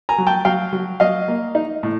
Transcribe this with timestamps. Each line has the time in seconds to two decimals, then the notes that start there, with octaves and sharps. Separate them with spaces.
0.09 G#5 A#5
0.18 F#3
0.27 G5 A5
0.45 F#3 F5 G5
0.73 F#3
1.00 F#3 D#5 F5
1.28 A#3
1.55 D#4
1.83 A2